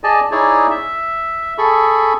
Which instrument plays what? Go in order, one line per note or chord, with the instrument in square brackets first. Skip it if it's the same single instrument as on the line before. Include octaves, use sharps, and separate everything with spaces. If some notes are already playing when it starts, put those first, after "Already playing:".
[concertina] G#4 D5 D#5 G#5 A5
D#4 E4 G#4 C#5 D5
E5
G#4 A4 B5 C#6